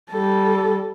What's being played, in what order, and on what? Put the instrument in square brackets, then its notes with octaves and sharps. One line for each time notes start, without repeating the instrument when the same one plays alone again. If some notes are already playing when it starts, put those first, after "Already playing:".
[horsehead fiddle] G3 A4